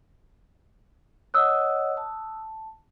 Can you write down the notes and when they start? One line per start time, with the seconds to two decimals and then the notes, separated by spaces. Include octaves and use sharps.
1.34 C#5 D#5 F#5 D#6 E6 F#6
1.97 A5